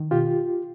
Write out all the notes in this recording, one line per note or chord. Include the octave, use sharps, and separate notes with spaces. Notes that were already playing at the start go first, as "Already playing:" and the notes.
Already playing: D#3
B2 F4 G4